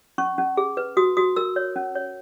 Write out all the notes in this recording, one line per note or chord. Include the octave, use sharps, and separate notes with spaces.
C#4 C#6
C#4
G#4
B4
F#4 D#6
F#4 D#6
A#4 E6
C#5
C#4
C#5